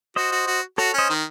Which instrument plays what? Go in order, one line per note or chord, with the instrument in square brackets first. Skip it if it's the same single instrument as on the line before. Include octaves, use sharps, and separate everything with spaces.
[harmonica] F#4 [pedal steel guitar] C5 D#5
[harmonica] F#4
F#4
[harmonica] F#4 [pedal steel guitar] A4 C#5
[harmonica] C#4 [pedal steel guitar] C5 D#5
[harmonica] D#3